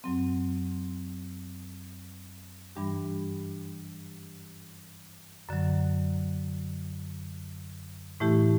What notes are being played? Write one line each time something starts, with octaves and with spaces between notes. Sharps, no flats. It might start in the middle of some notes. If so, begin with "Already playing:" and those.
F#2 F#3 C4
G2 E3 G3 D4 G4
F#2 D3 F#3
A2 E3 A3 E4 G4